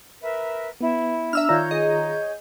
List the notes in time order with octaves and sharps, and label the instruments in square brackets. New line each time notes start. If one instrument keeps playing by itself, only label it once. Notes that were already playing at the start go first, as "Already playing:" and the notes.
[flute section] A#4 B4 E5
[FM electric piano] B3 [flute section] E4
[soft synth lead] D4 [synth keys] E5 E6 F6 [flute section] A#5
[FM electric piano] D#3 F4 A#5 [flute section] C#5 G6 [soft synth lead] D5
[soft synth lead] G#4 [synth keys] D#5